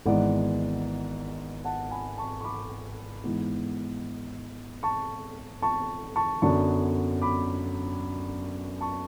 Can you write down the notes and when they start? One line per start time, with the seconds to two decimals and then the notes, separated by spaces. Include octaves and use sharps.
0.06 G#1 G#2 E3 G#3 B3 D5 F#5
1.65 F#5 A5
1.91 G#5 B5
2.18 A5 C#6
2.40 C#6
2.44 B5 D6
3.24 G#2 E3 G#3 B3
4.83 A5 C#6
5.62 A5 C#6
6.16 A5 C#6
6.42 F#2 D3 F#3 B3 D4 A5 C#6
7.22 B5 D6
8.81 A5 C#6